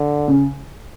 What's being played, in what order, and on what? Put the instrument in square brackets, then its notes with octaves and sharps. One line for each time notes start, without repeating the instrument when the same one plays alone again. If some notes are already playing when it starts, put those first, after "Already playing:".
Already playing: [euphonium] D3
[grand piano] C#3